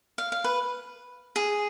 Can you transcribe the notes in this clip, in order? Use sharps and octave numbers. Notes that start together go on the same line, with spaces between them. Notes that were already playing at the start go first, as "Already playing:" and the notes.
F5
F5
B4
G#4